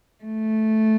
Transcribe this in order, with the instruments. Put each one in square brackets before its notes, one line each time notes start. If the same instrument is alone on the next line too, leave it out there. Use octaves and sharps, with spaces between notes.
[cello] A3